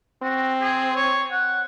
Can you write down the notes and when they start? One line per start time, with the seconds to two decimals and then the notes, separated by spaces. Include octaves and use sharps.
0.22 C4 F#4
0.61 G#4
0.96 C#5
1.31 F#5